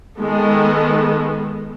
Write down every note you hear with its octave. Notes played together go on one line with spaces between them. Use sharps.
D#3 G#3 B3 A4